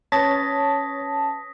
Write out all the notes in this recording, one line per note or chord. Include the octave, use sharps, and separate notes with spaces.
C#4 B4 C#5 A5 D#6 A#6 B6